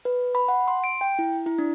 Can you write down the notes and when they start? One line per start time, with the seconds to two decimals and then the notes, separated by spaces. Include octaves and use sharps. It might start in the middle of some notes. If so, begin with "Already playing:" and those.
0.05 B4
0.35 B5
0.48 F#5
0.68 C6
0.84 D7
1.01 G5
1.19 E4
1.46 E4
1.59 D4